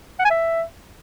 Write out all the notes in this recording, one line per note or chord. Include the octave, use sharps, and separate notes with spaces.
F#5
G#5
E5